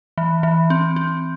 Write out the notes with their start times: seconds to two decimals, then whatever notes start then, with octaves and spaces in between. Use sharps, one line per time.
0.18 E3
0.43 E3
0.70 C4
0.96 C4